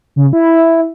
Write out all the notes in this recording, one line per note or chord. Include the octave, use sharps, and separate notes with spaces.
C#3
E4